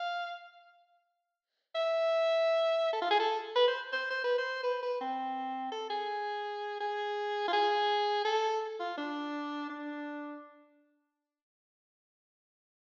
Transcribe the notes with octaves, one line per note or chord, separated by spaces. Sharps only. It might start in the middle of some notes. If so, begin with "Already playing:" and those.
Already playing: F5
E5
A4
F4
G#4
A4
B4
C5
C5
C5
B4
C5
B4
B4
C4
A4
G#4
G#4
F4
G#4
A4
F4
D4
D4